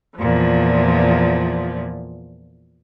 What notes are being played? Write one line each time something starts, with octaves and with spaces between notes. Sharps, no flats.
E2 A#2 F3